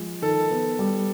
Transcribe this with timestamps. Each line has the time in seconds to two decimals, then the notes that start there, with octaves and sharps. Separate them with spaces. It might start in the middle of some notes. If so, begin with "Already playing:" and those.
Already playing: F3 G#3
0.22 D#3 A4
0.51 B3
0.79 G3